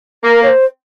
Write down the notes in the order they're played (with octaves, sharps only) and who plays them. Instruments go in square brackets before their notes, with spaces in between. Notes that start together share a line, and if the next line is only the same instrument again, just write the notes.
[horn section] A#3 [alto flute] A#4
[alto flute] C#5
C5